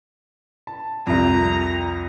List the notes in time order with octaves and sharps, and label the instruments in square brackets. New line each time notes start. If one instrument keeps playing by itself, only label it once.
[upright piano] A5
[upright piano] C2 F2 [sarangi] A#5